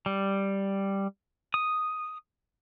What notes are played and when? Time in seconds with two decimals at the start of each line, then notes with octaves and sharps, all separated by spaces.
0.06 G3
1.54 D#6